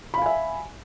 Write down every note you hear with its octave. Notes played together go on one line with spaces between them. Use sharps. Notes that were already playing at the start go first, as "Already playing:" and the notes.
E5 F5 G#5 B5